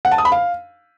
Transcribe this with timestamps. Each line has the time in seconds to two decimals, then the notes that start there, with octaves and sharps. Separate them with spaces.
0.05 F#5
0.11 A5
0.18 D#6
0.25 B5
0.32 F5